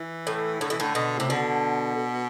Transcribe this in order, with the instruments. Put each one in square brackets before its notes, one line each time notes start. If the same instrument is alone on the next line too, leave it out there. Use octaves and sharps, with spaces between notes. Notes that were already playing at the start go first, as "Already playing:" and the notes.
Already playing: [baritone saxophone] E3
[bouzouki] A2
[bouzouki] A2 [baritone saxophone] D3
[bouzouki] B2 [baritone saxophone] E3
[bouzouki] A2 [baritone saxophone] D3
[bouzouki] B2
[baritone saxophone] A2 [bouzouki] C3
[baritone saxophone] B2 [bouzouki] D3